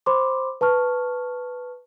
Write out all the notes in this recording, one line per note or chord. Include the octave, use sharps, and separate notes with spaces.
C5 B5 C6 D6
B4 A5 C#6 F6